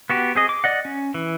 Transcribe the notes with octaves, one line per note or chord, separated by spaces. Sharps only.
B3 F#4 G4
C4 G#4 D#5
D6
D5 D#5 F#5
C#4
E3